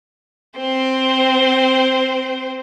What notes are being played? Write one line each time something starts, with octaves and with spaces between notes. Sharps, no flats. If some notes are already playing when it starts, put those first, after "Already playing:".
C4 C5